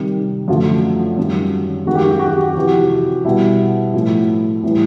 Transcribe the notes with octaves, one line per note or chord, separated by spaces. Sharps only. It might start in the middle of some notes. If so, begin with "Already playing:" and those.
Already playing: C3 D#3 G3
F#2 D3 F3 A3 F4
F#2 D#3 G3
F#2 D#3 G#3 F#4
G4
F#4
G4
F#4
G4
F#4
G4
F#4
F2 C3 E3 G4
F#4
B2 G3 E4
A2 F3 A3
A2 E3 G3